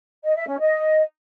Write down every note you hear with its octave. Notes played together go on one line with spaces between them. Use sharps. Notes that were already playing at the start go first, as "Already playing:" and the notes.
D#5
E5
C#4
D#5